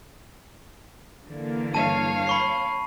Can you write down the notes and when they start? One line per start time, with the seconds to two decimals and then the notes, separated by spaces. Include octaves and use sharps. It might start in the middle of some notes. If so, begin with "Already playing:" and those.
1.26 D3 E3 A#3
1.74 G2 C#5 F5 A5 D#7
2.27 B5 C#6 C7